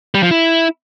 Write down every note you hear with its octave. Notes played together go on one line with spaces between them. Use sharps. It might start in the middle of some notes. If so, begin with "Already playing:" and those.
G3
F3
E4